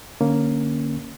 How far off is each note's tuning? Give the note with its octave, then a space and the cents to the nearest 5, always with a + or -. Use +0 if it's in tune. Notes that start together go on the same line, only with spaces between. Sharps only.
D3 +30 A#3 +0 C#4 +0